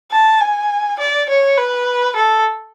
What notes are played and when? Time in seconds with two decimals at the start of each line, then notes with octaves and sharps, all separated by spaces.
0.12 A5
0.41 G#5
0.99 D5
1.29 C#5
1.57 B4
2.16 A4